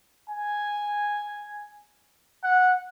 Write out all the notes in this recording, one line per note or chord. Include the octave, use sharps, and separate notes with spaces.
G#5
F#5